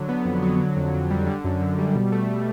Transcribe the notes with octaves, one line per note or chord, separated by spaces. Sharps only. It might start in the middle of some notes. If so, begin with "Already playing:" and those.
Already playing: D3 F#3
B3
F2
F#3
D3
F2
F2
G3
D3
F#2
F#2
G3
B2
A3